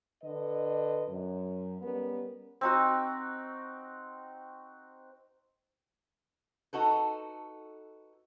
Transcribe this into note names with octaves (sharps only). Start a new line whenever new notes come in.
D3 B4 D#5
F#2
G3 B3 C#4 A#4
C4 D#4 F#4
D#4 F#4 A4 B4